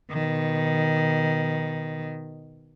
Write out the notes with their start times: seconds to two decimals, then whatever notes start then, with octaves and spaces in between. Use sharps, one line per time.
0.11 B2 D#3